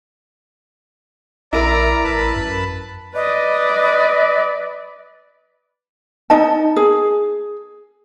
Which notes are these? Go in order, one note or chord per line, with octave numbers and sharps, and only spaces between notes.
A#1 E4 A#4 D5 E5 A#5
A1 B4 A5 B5
F#2
B4 D5 D#5
D#4 D#5 A5
G#4